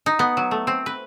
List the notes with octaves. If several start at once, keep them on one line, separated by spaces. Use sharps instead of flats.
D#4
B3
F#3
A3
C4
B4